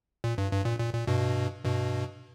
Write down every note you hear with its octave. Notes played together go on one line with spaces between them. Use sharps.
A#2
G2
G2
A#2
A#2
A#2
G2 B2
G2 B2